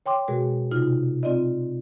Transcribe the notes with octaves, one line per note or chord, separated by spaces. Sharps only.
C#5 G5 C6 D6
B2 G#3 F#4 G#4 A#4
C3 D#4 F4 F6
C4 F4 D5 D#5